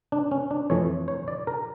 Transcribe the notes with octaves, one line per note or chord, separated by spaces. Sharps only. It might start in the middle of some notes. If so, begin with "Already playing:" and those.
D4
C#4
D4
F2 E3 A3 C#5
C#5
D5
A#4